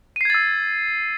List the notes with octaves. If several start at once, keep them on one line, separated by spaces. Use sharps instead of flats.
E6 G#6 A6 C7 D#7